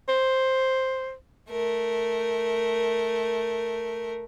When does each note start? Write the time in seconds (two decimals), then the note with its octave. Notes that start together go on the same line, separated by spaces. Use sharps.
0.09 C5
1.50 A3 A#4